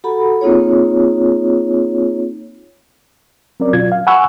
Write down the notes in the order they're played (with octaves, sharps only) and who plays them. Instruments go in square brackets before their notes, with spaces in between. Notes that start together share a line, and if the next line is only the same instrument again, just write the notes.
[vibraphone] F#4 G4 A4 F#5 A#5 B5
A#3 C4 D#4 F4 G#4 C#5
[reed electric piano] F#3 C4 C#4 A#4 D5
B2 F#3 F4 G#6
F5
F#5 G#5 B5 C#6 E6 F#6